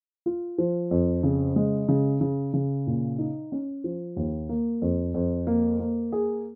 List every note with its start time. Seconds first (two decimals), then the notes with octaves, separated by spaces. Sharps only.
0.26 F4
0.58 F3
0.91 F2
1.23 C#3
1.56 G#3
1.88 C#3
2.21 C#3
2.54 C#3
2.87 A#2
3.18 D#4
3.52 C#4
3.84 F3
4.16 D#2
4.49 A#3
4.82 F2
5.14 F2
5.47 A#3
5.80 A#3
6.12 G#4